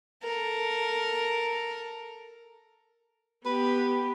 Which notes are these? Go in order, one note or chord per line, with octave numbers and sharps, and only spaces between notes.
A4 A#4
B3 G4 B4